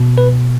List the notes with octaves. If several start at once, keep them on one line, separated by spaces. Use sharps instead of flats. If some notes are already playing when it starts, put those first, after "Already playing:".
Already playing: B2
B4